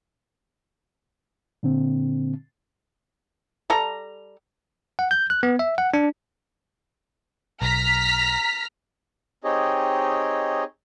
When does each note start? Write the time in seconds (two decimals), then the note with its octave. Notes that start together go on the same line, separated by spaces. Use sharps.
1.63 A#2 D3 C4
3.70 G3 A4 A#5
4.99 F#5
5.11 G6
5.30 F#6
5.43 B3
5.59 E5
5.78 F#5
5.94 D4
7.62 B1 A#5 F6 B6
9.44 C4 D#4 G4 G#4 C#5 D#5